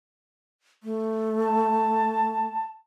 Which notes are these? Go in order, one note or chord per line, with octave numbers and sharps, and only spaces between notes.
A3
A5